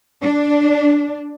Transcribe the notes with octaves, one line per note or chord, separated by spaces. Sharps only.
D4